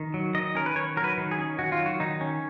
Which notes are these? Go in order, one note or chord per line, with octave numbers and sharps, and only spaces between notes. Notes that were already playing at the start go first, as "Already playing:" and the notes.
Already playing: D#3
F#3
D#3 D#5
C#4 A#4
B4
D#3 C#5
F#3 A#4
B4
D#3
G#4
C#4
D#3 F#4
F4
F#3
F#4
D#3 D#4
C#4